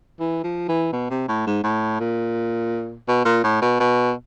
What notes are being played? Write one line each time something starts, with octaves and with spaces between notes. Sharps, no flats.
E3
F3
E3
B2
C3
A2
G#2
A2
A#2
B2
A#2
A2
B2
B2